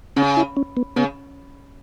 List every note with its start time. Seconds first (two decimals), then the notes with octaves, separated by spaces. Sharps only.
0.16 C#3 C#4
0.37 E4
0.57 C#4
0.77 B3
0.96 C#3 B3